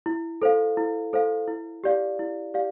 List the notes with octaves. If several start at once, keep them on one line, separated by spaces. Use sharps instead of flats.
E4
A4 C5 F5
E4
A4 C5 F5
E4
G4 D5 F5
E4
G4 D5 F5